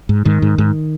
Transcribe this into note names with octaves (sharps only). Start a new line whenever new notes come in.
G#2
G#2 D#3
G#2
G#2